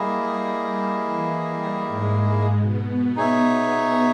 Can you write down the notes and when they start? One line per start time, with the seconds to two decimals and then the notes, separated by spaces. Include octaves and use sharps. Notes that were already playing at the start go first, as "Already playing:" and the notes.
Already playing: G3 A#3 E4 G#4 D#5
0.60 G3
1.03 E3
1.46 G3
1.87 G#2 G#3
2.31 G#2 G#3
2.59 B2 B3
2.87 B2 B3
3.16 D#4 G#4 C#5 E5